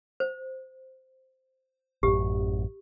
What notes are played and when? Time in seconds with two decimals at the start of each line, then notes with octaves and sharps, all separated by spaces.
0.20 C5
2.03 A1 F#2 G4